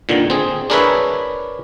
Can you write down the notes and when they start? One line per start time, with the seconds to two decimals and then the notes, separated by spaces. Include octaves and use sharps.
0.09 A#2 D3 D#3
0.30 C4 G#4
0.70 D4 G#4 A#4 B4 C#5 E5